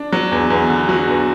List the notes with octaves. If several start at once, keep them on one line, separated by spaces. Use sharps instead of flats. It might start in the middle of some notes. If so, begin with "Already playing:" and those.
Already playing: D4
F#3
E2
E2
D3
F#3 F#4
E2